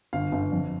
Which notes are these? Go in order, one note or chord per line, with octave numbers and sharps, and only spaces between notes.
G1 F5
G1
F2